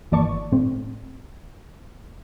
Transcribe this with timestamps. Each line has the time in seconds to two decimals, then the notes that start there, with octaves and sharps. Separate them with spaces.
0.11 G1 E3 A#3 D5 A5 C#6
0.52 A2 C4